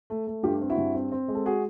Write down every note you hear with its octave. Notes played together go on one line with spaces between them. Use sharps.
A3
A3
G2 F4 G4
C4
E4 F#4
G2
C4
C4
G#3
A4
F#4 G#4